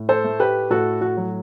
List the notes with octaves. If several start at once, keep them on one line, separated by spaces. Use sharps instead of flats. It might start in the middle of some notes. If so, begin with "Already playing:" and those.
Already playing: A2
A4 C5
A3
G4 B4
A2 F#4 A4
F#4
F#3